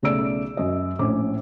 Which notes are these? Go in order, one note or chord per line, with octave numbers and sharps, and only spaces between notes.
B1 C#3 A3 D5 E6 D7
F#2 D#5
A#1 A2 C#4 D6